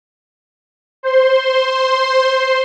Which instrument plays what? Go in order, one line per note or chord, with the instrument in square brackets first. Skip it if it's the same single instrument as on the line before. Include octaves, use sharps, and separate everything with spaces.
[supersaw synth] C5 C6